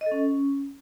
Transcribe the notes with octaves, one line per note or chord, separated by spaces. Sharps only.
D#5
A4
C#4